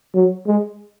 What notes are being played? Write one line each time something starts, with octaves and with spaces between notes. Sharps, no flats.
F#3
G#3